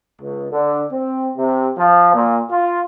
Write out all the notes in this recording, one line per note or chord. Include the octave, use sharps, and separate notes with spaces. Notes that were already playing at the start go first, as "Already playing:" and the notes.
C#2
D3
C4
C3
F3
A#2
F4